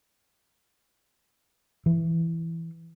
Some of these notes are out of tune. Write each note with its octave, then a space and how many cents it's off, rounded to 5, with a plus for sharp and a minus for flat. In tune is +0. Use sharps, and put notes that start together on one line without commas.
E3 +5